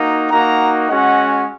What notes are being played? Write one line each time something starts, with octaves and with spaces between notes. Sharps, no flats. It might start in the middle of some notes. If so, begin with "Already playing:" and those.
Already playing: A#3 D#4 F#4
A#3 D#4 F#4 F#5 A#5
G#3 C#4 F#4 D#5 F#5